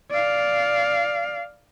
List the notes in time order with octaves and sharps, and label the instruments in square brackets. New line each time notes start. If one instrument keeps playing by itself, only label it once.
[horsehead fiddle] D5 F5